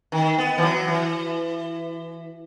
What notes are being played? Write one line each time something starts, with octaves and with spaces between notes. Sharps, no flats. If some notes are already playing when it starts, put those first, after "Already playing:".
D#3
B3
E3
F#3
E3